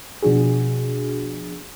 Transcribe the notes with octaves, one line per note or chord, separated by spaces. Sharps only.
B2 F3 D4 F#4 G#4